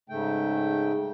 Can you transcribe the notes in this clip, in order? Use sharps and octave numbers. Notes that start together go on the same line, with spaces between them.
G#2 C#3 A3 G5